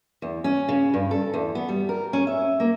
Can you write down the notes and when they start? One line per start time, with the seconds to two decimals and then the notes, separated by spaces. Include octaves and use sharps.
0.22 E2
0.44 C#4
0.69 C#3
0.94 G2
1.11 A4
1.34 E2
1.55 B3
1.69 G3
1.89 A#4
2.13 C#4
2.27 E5
2.60 A#3